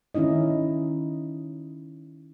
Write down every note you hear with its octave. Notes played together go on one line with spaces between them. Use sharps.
D#3 C#4 D#4 E4 D#5